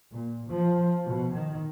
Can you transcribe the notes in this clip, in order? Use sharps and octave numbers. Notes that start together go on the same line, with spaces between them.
A#2
F3
B2
D#3